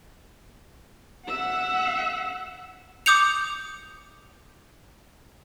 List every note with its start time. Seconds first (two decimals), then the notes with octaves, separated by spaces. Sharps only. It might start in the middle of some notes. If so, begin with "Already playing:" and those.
1.26 E5 F#5
3.06 D6 D#6 G6 C#7 F7